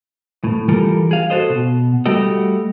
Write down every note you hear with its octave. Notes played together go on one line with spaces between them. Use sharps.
A2
E3 G3 F4 A4 A#4
G#4 F5
F#4 A4 C5 D#5
B2
G3 A3 F#4 G4 D#5